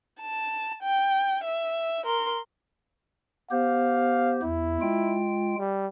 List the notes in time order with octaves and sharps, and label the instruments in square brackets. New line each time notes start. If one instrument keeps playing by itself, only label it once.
[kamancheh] A5
G5
E5
A#4 C6
[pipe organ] B3 G4 C5 [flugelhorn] F5
[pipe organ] E2 [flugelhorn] E4
[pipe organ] G#3 F4 G5
[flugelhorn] G3